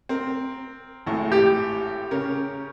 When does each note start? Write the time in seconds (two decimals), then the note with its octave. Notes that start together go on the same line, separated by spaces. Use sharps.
0.09 C4 A#4
1.06 G#1 A2
1.32 G4
2.11 C#3 A#4 C#5